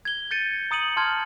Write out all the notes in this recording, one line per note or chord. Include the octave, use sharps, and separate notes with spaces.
G#6 G7
G6 A6 C#7 D#7
A#5 D#6 C#7 D#7 F#7
A5 C6 F6 G#6